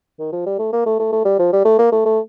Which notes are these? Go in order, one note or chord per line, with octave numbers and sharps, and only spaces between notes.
D#3
F3
G3
A3
A#3
A3
A3
A3
G3
F3
G3
A3
A#3
A3
A3